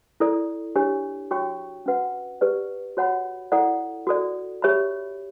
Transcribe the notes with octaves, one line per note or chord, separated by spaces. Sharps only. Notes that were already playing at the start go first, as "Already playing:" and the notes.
E4 A4 D5
D4 G4 C#5
F#4 C#5 G5 C#6
C#4 F#4 B4 F#5
G4 B4 D5
F#4 C#5 F#5 B5
E4 A4 D5 F#5
F#4 A4 D5
G4 C#5 E5 B5